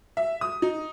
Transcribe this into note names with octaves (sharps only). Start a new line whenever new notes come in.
E5
D#6
D#4